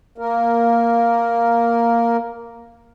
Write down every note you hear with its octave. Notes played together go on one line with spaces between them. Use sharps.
A#3 A#4